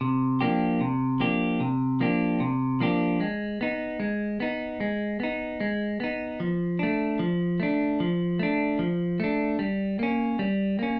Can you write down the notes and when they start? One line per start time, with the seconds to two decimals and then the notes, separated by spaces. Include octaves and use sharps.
0.01 C3
0.41 F3 A#3 D4 G4
0.81 C3
1.20 F3 A#3 D4 G4
1.60 C3
2.00 F3 A#3 D4 G4
2.40 C3
2.80 F3 A#3 D4 G4
3.20 G#3
3.61 B3 D#4
4.00 G#3
4.40 B3 D#4
4.80 G#3
5.20 B3 D#4
5.60 G#3
6.00 B3 D#4
6.40 F3
6.79 A3 D4
7.19 F3
7.60 A3 D4
8.00 F3
8.39 A3 D4
8.79 F3
9.20 A3 D4
9.59 G3
9.99 A#3 C#4
10.39 G3
10.79 A#3 C#4